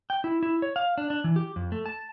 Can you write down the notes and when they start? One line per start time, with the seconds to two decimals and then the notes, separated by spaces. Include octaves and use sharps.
0.10 G5
0.24 E4
0.43 E4
0.62 C#5
0.76 F5
0.98 D4
1.10 D4
1.24 E3
1.36 G4
1.56 F2
1.72 A3
1.86 A5